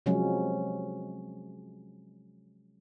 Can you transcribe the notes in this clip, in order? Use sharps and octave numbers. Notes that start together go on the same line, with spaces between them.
C3 F3 F#3 G#3 C#4